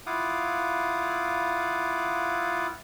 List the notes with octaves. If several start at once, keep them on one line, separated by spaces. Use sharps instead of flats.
E4 F4 F5 F#5 D6 D#6